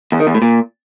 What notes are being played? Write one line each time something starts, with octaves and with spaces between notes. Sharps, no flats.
E2
D#3
E2
A2
A#2